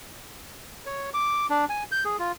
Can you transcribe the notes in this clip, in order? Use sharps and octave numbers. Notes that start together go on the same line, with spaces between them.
C#5
D6
D4
G#5
G6
G#4
F4